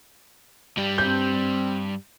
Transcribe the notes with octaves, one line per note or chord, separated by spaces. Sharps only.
G2 G3
C4 G6